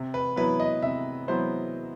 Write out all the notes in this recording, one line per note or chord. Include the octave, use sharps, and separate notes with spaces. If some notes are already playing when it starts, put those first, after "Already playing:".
Already playing: C3
B4
F#3 B3 E4 B4
D#5
C3 E5
F#3 B3 E4 C5